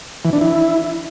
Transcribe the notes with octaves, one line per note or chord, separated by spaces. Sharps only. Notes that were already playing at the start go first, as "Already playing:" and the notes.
E3
D4
E4